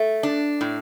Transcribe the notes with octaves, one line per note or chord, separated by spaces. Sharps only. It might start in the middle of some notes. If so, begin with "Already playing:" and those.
Already playing: A3
D4
A2